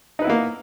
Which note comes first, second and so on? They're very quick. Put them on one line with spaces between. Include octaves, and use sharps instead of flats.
D#4 B4 E4 B3 A#3